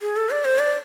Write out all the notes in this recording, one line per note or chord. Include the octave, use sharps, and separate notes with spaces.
G#4
A4
D5
C5
D5